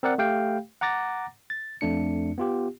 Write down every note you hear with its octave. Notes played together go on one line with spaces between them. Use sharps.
C4 A#4 D5 F#5
A3 G4 F5 G5
F#5 A#5 D6 A6 A#6
A6
F2 A3 D4 C#7
B3 F4 G4